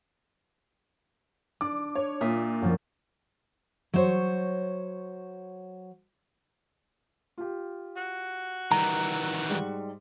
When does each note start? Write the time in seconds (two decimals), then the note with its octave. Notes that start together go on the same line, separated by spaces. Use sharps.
1.61 D4 D6
1.95 C#5
2.21 A#2 F4 E5 D#6
2.62 F#2 F3
3.94 F#3 C5 C#5
7.38 F4 G4
7.96 F#4
8.72 D#3 E3 G3 A#5
9.49 G#2 G3 G#3